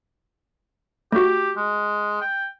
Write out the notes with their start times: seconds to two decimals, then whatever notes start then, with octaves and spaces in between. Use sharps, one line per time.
1.12 A3 F#4 G4
1.57 G#3
2.21 G5